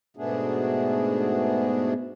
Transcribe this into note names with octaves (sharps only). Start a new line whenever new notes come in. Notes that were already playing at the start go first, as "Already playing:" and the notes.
G#2 B2 A3 B3 D4 G#4